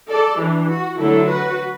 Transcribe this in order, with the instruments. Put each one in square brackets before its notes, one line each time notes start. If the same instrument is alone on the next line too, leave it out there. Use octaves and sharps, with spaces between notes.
[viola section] A4 D5
E3 D4
F#4
D3 F#3 A3 E4 A4
F#4 B4